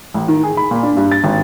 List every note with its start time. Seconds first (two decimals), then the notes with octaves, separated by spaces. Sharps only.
0.14 A1
0.28 D#3
0.44 G#4
0.57 B5
0.71 A#2
0.83 D4
0.97 G2
1.12 A6
1.24 G#1